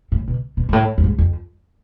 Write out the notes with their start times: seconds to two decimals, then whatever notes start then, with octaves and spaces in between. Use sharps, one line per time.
0.12 A2
0.28 B2
0.57 B2
0.69 G#2
0.73 A2
0.98 F2
1.04 G#2
1.18 F2